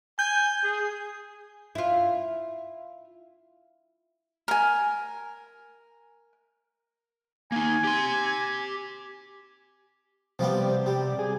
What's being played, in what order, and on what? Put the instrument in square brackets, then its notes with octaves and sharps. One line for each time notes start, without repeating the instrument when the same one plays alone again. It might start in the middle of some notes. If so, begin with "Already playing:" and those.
[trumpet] G#5 [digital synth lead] G6
[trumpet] G#4
[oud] E4 F4
[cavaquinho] A#4 G#5
[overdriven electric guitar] A#3 D#4 [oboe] G#5
[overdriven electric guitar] G4 C6
[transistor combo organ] C3 [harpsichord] F3 G3 B3
[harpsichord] G3
[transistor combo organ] G#4